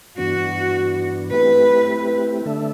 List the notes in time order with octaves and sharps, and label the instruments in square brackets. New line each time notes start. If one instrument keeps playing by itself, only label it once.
[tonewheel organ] G2 E3 B3 D4 [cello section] F#4
[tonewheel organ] A3 C4 E4 G4 [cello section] B4
[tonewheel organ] D3 A3 D4 A4 E5